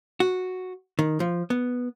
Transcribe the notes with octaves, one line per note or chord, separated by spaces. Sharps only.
F#4
D#3
F3
B3